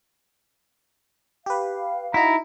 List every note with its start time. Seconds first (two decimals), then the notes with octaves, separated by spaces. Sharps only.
1.46 G4 B4 F5
2.14 D#4 E4 F#4 A#5